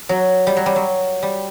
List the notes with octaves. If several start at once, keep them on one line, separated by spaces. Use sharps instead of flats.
F#3
G3
F#3
G3
F#3
G3